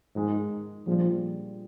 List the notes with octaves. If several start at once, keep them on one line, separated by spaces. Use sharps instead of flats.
G#2 D#3 G#3 D#4
A#2 F3 G3 D4 G#4